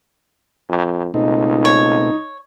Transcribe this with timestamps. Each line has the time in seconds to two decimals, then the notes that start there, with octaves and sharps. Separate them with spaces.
0.69 F2
1.14 C#2 B2 A3 C4 D#4
1.65 C#5